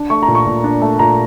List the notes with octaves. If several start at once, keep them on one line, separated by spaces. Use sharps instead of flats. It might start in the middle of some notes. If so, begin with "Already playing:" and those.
Already playing: D4
A3 C#6
A#5
A#2
C#6
A#2
D4
A3
A#2 A#5